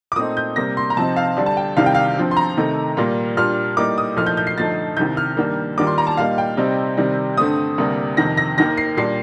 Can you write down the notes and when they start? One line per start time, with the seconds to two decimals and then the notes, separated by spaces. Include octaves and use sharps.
0.12 D6
0.16 A#2 A3 C4 D#4 D#6
0.37 G6
0.56 C3 G3 A#3 A#6
0.77 C6
0.90 A#5
0.97 C3 F3 C4 D#4 A5
1.16 F5
1.37 D2 D3 G3 D4
1.46 A5
1.57 G5
1.77 C2 C3 D#3 G3 F5
1.86 G5
1.95 F5
2.17 G2 F3 C4
2.31 C6
2.37 A#5
2.57 C3 D#3 A3 D#4
2.97 A#2 G3 A#3 F4
3.37 A#2 G3 D4 F4 F6
3.77 A2 G3 A#3 D#4 D6
3.98 D#6
4.17 C2 A#2 F3 A3 D#4 F6
4.27 G6
4.37 G6
4.47 C7
4.57 G2 D3 F3 A3 D#4 A6
4.97 C2 C3 D#3 G6
5.17 F6
5.37 G2 D#3 G3 A#3
5.78 D#2 D#3 G3 A#3 F4 D6
5.87 C6
5.98 A#5
6.07 A5
6.17 A#2 G3 A#3 D#4 F5
6.38 G5
6.57 C3 G3 C4 D#4
6.97 C3 D#3 G3 C4
7.37 G2 D3 A3 C4 D#6
7.78 D2 C3 G3 A#3
8.17 F2 C3 D#3 A#6
8.37 A#6
8.58 D#2 D#3 A#3 A#6
8.77 C7
8.97 A#2 G3 D4 C7